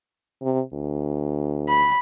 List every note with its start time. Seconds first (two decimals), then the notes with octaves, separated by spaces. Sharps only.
0.43 C3
0.73 D2
1.68 B5